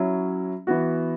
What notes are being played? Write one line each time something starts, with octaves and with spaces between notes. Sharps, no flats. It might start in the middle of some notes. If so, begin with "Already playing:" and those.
Already playing: F#3 C#4 E4
E3 B3 F#4